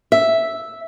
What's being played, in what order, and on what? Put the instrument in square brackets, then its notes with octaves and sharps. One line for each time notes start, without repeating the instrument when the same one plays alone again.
[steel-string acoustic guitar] E5